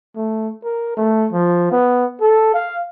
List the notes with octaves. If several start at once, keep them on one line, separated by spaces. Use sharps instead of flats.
A3
A#4
A3
F3
B3
A4
F5